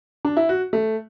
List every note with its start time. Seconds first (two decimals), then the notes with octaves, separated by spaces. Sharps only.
0.25 D4
0.37 E4
0.49 F#4
0.73 A3